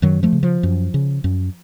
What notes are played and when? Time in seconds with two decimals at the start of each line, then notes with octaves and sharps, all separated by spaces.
0.02 F#2 D#3 F#3
0.23 F3 A3
0.33 C#3
0.43 F3
0.63 F#2
0.94 C#3
1.24 F#2